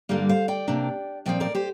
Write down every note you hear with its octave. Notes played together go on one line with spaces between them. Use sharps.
G2 D3 G3 A#3 A#4 D5
C5 F5
D5 G5
C3 A#3 D4
A#2 F3 C4 D5 G5
A#4 D5
G4 C5